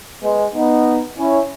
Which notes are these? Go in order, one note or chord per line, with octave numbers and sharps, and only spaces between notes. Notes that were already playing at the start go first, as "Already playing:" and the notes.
G#3 B3
B3 D#4
C#4 E4